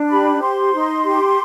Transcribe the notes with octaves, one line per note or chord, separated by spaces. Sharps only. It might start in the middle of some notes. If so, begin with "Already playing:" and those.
Already playing: D4
G4 B5
C5 C6
D#4
G4